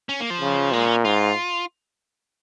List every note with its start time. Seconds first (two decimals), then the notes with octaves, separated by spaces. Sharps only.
0.09 C#4
0.20 A#3
0.30 F3
0.41 C#3
0.72 A#2 G#3
0.84 C#4
1.05 G#2 F4